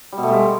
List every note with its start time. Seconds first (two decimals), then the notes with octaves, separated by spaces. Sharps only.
0.12 G3
0.18 B2
0.23 A3
0.28 G3
0.33 G#3